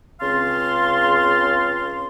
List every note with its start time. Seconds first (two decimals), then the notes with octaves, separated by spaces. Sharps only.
0.20 C#2 C#3 C4 F5 A5 C6